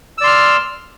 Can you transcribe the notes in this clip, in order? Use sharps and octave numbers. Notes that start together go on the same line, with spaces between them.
D5 C6 E6 F6